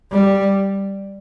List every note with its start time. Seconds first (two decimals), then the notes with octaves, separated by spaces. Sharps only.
0.12 G3